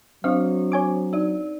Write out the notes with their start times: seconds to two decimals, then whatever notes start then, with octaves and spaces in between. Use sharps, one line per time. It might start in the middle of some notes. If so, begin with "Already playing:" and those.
0.24 F#3 C4 D4 C5 F5
0.72 C#5 G#5 D6
1.13 D#4 D5